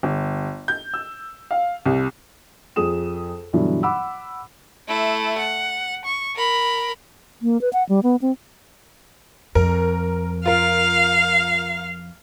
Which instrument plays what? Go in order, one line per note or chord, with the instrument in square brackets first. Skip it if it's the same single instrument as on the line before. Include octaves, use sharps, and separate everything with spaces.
[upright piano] G1
G6
E6
F5
C2
[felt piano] F2 G#4 D#6 E7
G2 B2 D3 E3 F#3
F#5 B5 D6 E6
[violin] A3 E4
F#5
C#6
A#4 B5
[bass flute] A#3
B4
F#5
G3
B3
C4
[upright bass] F2 [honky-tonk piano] A#4
[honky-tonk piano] F4 A#4 [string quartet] F5